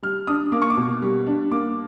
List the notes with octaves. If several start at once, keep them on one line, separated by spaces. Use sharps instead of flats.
G3 F6
D4 D#6
A#3 D6
C#6
D6
B2
G3
D4
A#3 D6